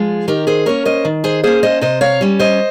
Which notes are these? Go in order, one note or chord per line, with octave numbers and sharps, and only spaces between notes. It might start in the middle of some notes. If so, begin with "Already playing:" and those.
Already playing: F3 G#3 F4 G#4
D#3 G4 A#4
G#4 C5
A#3 C#4 A#4 C#5
C5 D#5
D#3
G#4 C5
A#3 C#4 G#4 C5
C5 D#5
C3 C5 D#5
C#5 F5
G3 C#4
C5 D#5